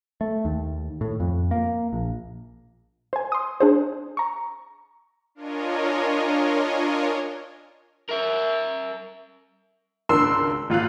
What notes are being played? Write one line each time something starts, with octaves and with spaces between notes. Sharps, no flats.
A3
D#2
A2
F2
A#3
A#1
C5 G#5
C6 D#6
D4 G#4 C5
A#5 C#6
D4 F4 A#4 C#5 D#5 G#5
A#4 E5
G#1 C#2 D4 A#4 C6 E6
G#1 F4 F5 F#6